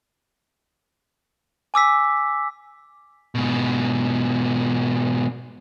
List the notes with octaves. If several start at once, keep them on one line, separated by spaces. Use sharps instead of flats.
G#5 D6 E6 B6
G#2 B2